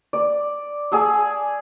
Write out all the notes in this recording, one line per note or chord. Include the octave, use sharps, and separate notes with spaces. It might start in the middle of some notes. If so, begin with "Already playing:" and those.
D5
G#4 A5 E6